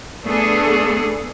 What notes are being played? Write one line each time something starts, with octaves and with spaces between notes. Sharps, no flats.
A3 B3 D4 G#4 A4